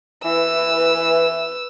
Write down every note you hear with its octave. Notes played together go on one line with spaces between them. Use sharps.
E3 B4 E6